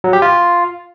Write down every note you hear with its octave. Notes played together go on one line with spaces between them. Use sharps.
F#3
G4
F4